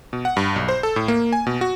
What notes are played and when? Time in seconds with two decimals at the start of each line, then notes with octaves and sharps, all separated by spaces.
0.13 B2
0.25 F#5
0.37 G2
0.56 B1
0.68 C5
0.83 A4
0.96 A2
1.08 A#3
1.33 G#5
1.47 B2
1.61 F#4